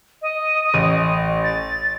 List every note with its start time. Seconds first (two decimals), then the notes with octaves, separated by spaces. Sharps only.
0.22 D#5
0.74 A1
1.44 A6